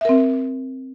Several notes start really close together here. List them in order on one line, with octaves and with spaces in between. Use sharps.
E5 A#4 C4